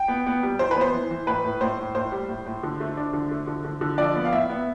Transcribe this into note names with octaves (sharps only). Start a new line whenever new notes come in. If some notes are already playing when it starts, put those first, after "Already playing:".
Already playing: G5
B3
B3
G3
E3 C5
B4
B3 C5
E3
E3
A2 B4
A2
A2 C5
A2
A2 C5
G3
A2
A2
D3
A3
D4
D3
A3
D3
D3
D3
F3 D5
B3
F5
A2 E5
B3